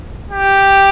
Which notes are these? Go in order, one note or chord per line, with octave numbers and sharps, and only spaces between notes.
G4